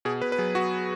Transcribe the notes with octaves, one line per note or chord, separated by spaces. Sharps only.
B2 G#4
B2 B4
B4
F#3 G#4
F#3 F#4